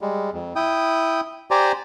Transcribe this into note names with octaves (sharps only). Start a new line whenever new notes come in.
G3 G#3
F2
E4 G5 D#6
G4 C5 D5 G#5 A#5